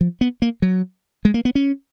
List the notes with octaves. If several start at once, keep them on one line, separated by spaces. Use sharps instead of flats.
F3
B3
A#3
F#3
G#3
A#3
B3
C#4